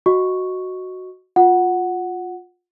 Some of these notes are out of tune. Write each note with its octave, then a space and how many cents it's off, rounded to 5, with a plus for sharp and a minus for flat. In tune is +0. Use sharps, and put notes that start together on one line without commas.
F#4 +0 D#5 +0 C#6 +0
F4 +20 F#5 +0